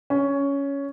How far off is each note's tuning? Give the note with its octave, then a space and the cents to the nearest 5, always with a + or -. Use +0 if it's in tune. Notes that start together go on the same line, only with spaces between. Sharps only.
C#4 +10